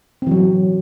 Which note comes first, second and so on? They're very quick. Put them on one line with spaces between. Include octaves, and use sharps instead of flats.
C4 E3 F#3